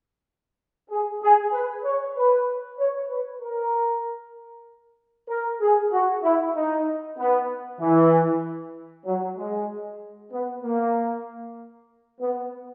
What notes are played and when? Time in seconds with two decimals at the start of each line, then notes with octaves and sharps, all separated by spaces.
0.90 G#4
1.22 G#4
1.53 B4
1.84 C#5
2.16 B4
2.78 C#5
3.09 B4
3.42 A#4
5.29 A#4
5.60 G#4
5.92 F#4
6.23 E4
6.55 D#4
7.17 B3
7.80 E3
9.06 F#3
9.37 G#3
10.31 B3
10.63 A#3
12.20 B3